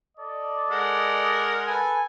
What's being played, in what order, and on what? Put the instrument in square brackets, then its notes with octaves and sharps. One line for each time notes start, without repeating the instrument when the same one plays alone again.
[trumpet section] A4 D5 D#5
[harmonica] G#3 A#4 F#5
[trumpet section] A4 B4 G#5